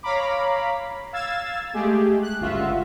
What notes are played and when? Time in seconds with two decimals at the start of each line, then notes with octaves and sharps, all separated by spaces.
0.03 C#5 F5 A#5 B5 D6
1.13 F5 E6 G#6 A6 E7
1.74 G#3 A3 G4 G#4
2.23 F#6
2.40 G1 C#2 F4 F#4 E5